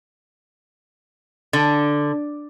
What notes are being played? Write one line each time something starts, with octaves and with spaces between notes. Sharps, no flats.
D3